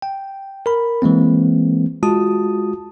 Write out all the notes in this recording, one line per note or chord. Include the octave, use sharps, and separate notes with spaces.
G5
A#4 B5
E3 G#3 A#3 C4
G#3 F4 F#4 A5 D#6